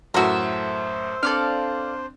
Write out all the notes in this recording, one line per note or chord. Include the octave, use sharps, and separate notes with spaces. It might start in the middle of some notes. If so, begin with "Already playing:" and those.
F#2 A2 F#4 A4 A#4 C5 E5
C4 D4 A4 D5 F5